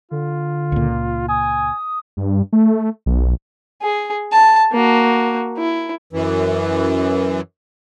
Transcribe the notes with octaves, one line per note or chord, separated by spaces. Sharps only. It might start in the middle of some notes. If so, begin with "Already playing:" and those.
D3 F4
C#2 A#2
G#5 D#6
G2
A3
B1
G#4
A5
A#3 F#4
E4
F#2 E3